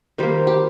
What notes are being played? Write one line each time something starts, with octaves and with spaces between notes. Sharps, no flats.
D#3 G3 A#3 C5
G4